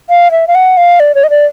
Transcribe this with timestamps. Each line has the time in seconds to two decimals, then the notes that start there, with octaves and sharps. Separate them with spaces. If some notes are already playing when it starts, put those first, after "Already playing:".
0.09 F5
0.31 E5
0.48 F5
0.55 F#5
0.77 F5
1.00 D5
1.15 C#5
1.24 D#5
1.30 D5